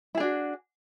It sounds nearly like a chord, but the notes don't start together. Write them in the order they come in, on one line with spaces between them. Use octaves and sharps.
E4 G#4 D4 F#4